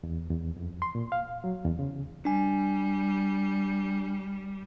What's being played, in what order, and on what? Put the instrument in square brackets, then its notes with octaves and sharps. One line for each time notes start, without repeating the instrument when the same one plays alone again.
[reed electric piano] E2
E2
F2
C6
A#2
F5
F#3
E2
C#3
[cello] G3 [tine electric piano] D4 G#5